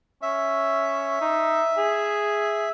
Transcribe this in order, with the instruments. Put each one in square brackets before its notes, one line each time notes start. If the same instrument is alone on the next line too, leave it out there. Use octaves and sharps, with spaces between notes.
[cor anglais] C#4 [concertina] E5
[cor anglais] D#4
G#4